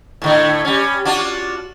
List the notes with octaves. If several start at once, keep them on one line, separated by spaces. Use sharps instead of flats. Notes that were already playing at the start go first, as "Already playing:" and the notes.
A2 D3 A3
G3 C#4
D4 F4 F#4